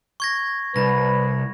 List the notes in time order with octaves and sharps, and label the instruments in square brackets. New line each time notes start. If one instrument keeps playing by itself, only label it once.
[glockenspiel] C#6 G#6 A#6
[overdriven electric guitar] C2 [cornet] B4 [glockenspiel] A#6